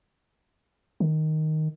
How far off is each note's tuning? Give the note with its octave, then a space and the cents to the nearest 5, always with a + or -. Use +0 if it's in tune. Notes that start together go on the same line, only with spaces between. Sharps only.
D#3 +0